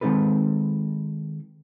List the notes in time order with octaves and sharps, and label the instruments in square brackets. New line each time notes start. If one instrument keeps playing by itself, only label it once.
[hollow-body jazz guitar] D#3 G#3 C4 D#4 A4 B4